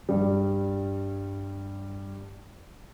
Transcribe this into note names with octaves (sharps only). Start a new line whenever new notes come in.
G2 G3